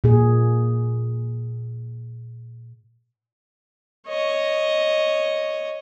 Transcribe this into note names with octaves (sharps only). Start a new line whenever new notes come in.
A#2 G#4
C#5 D#5